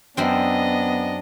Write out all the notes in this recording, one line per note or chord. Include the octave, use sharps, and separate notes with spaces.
F#2 B3 C4 D4 D#5